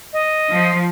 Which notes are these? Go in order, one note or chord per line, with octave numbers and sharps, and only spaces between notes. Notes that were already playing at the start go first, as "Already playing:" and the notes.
D#5
F3